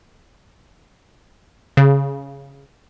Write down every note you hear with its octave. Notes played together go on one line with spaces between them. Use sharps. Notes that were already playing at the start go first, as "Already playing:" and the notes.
C#3